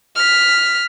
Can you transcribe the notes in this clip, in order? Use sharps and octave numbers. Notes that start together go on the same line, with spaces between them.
F6 B6